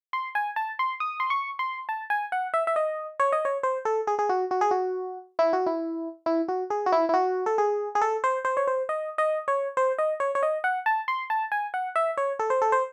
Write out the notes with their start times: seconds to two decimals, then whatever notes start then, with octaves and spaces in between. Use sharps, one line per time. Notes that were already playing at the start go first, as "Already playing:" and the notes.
0.13 C6
0.35 G#5
0.56 A5
0.79 C6
1.00 D#6
1.20 C6
1.30 C#6
1.59 C6
1.89 A5
2.10 G#5
2.32 F#5
2.54 E5
2.67 E5
2.76 D#5
3.20 C#5
3.32 D#5
3.45 C#5
3.63 C5
3.85 A4
4.07 G#4
4.19 G#4
4.29 F#4
4.51 F#4
4.61 G#4
4.71 F#4
5.39 E4
5.53 F#4
5.66 E4
6.26 E4
6.48 F#4
6.70 G#4
6.86 F#4
6.92 E4
7.09 E4
7.14 F#4
7.46 A4
7.58 G#4
7.95 G#4
8.01 A4
8.24 C5
8.45 C5
8.57 C#5
8.67 C5
8.89 D#5
9.18 D#5
9.48 C#5
9.77 C5
9.98 D#5
10.20 C#5
10.35 C#5
10.43 D#5
10.64 F#5
10.86 A5
11.08 C6
11.30 A5
11.52 G#5
11.74 F#5
11.96 E5
12.17 C#5
12.39 A4
12.50 C5
12.62 A4
12.72 C5